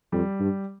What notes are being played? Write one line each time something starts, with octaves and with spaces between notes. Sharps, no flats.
F2 G3
G2